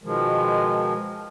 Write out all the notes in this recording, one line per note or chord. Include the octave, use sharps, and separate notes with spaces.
B2 D#3 F3 G#3